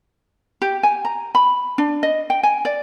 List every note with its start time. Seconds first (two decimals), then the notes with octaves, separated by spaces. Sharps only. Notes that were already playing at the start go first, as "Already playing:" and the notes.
0.62 G4
0.83 G#5
1.05 A#5
1.35 B5
1.78 D4
2.03 D#5
2.30 G5
2.43 G#5
2.65 D5